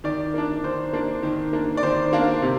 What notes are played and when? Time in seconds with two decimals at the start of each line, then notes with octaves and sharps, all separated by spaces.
0.04 D#3 D5
0.34 A#3 D4
0.63 D#3 C5
0.93 A#3 D4
1.23 D#3
1.53 A#3 D4
1.77 D5
1.83 D#3 C5
2.13 A#3 D4 F5
2.42 C3